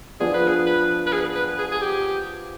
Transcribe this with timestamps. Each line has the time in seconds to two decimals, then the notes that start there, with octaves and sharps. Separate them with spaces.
0.20 F3 B3 D4 F4 G#4
0.34 B4
0.48 G#4
0.66 B4
1.06 B4
1.13 G#4
1.35 B4
1.58 G#4
1.71 G#4
1.81 G4